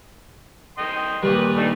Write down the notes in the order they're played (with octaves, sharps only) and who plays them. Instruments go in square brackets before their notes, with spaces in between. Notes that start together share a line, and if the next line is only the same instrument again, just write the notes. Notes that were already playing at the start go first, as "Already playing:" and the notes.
[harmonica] D#5 G5 C6
[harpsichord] A#2 D#3 G3 [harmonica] B4
[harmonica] A3 D4 D#4